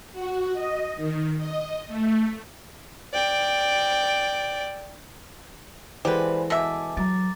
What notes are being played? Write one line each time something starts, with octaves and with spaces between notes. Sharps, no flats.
F#4
D#5
D#3
D#5
A3
D5 G5
E3 G#3 G4 A4 B4 C5 D5 F#5
B2 E5 G#5 A5 D6
F#3 A#5 D6 A6